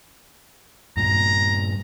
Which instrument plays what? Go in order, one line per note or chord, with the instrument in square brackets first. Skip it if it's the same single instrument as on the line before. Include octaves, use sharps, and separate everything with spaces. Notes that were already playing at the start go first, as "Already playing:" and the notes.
[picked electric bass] G2 A#2 [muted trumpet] A#5